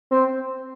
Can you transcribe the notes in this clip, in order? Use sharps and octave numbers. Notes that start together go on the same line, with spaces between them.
C4